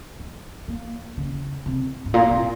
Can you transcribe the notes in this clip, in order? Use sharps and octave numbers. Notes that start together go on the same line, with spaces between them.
G#3
A#3
C#3
C3
G#2
A#2
C3